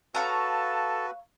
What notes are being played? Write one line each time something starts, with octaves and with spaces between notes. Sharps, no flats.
F#4 A4 B4 C#5 F5 A5 A#5